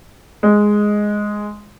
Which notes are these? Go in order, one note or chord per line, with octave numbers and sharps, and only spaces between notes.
G#3